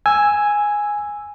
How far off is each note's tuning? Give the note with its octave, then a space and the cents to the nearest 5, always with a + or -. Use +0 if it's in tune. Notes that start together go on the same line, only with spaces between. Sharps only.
G#5 +0 E6 +0